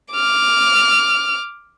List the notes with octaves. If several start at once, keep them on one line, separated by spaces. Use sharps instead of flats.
D6 F6